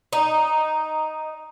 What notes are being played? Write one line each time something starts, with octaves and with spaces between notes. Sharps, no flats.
D#4